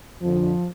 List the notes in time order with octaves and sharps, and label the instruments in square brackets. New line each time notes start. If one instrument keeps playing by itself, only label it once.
[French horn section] F2 D3 F3